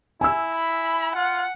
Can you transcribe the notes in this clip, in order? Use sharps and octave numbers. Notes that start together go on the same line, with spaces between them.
E4 G#5 E6
B5
F4 F#5